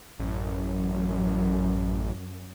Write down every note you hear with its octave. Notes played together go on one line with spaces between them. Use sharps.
A1 F#2